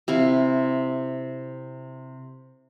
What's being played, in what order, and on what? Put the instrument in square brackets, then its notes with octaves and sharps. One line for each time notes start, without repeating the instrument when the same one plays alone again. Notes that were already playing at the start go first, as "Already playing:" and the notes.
[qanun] C3 E4 F5